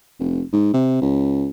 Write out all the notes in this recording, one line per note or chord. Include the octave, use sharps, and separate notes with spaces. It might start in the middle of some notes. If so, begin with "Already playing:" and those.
F1
G#2
C3
C#2